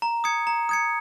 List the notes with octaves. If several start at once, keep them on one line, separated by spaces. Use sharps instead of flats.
A#5
D#6 G#6 C#7
A#5
D#6 G#6 C#7